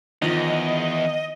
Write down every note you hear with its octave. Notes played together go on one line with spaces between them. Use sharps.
E2 D#3 F3 D#5